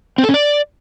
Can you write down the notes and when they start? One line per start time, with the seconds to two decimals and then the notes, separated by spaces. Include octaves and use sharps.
0.18 C4
0.23 A4
0.29 C#4
0.34 D5